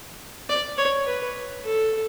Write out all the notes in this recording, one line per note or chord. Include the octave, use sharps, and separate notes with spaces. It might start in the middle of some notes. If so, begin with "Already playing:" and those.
D5
C#5
B4
A4